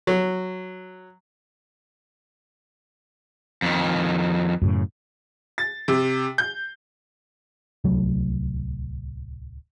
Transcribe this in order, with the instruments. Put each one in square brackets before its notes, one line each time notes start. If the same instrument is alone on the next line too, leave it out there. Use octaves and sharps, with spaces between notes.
[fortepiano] F#3
[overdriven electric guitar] F2 D#3
[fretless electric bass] F#2 A2 C#3
[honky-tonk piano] A6
C3
G6
[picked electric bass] D1 C2 A2 F#3